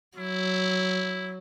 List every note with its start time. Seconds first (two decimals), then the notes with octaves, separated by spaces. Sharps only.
0.18 F#3 E4